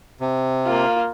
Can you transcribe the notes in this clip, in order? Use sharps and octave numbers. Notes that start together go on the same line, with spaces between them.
C3
A#3 F4